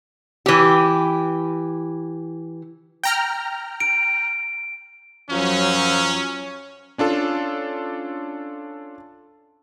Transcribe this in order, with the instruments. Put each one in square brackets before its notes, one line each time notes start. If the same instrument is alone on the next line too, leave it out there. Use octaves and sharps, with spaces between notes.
[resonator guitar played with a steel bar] E3 G4
[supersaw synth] G5 A#5 F6
[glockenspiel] D7
[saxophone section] F#2 F3 F#3 [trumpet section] C#4
[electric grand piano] C#4 D4 F4 A4